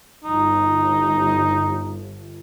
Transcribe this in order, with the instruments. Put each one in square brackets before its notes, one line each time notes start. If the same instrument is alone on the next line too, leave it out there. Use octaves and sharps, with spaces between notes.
[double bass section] G1 [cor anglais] D#4